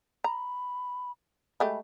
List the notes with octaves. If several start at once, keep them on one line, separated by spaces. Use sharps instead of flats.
A#5 B5
G#3 A3 G4 B5